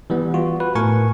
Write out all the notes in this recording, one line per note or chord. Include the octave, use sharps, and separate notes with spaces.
E3 G3 B3
F4 F#4
B4
A2 A#4 G#5 C#6